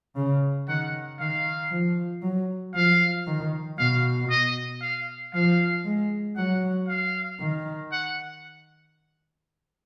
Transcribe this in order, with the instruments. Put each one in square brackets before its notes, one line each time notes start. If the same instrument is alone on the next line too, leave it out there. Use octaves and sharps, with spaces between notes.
[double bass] C#3
[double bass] D#3 [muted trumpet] F#5
[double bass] D#3 [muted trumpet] F5
[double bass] F3
F#3
[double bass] F3 [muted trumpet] F5
[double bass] D#3
[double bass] B2 [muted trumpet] F5
[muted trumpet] D#5
F5
[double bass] F3 [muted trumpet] F5
[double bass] G#3
[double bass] F#3 [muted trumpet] F#5
[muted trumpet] F5
[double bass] D#3
[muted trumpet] F#5